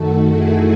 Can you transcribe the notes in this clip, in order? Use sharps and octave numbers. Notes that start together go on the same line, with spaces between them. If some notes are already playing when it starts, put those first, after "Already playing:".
Already playing: F#2 D#3 A3 F#4 A4
E4 G#4